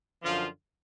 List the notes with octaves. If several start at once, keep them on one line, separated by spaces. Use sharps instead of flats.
F#2 D3 F3 F4